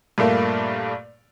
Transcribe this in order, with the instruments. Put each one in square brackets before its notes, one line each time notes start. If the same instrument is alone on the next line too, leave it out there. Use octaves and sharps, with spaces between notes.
[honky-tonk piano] G2 A#2 A3 A#3